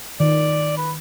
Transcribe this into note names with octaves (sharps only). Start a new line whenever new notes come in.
D#3 D5
B4